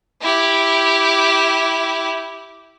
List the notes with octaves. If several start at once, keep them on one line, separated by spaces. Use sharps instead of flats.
E4 G4